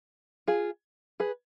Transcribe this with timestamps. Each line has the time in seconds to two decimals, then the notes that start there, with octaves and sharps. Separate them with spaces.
0.48 F4 G#4
1.20 G#4 B4